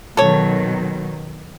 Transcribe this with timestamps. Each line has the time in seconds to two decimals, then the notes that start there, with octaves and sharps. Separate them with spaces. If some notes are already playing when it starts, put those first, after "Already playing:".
0.17 B2 D#3 F#3 A4 C#5